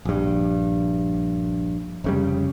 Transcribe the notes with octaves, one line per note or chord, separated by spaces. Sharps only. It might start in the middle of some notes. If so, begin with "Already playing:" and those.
A#1 G2
F1 C#3 G3